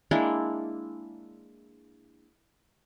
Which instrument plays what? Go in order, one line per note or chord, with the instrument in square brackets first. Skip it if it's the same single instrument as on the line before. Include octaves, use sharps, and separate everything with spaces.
[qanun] G#3 A#3 D4 E4